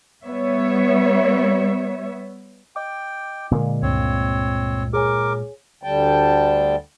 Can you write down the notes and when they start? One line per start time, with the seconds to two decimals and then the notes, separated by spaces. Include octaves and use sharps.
0.24 G3 B3 C#5 E5
2.76 D#5 G5 D6
3.51 A#2 D3 G#3 A#4
3.82 C#2 G2 C4 C#5
4.93 G#4 A#4 C#5 G#5 D6
5.83 D2 D3 G3 G5 A5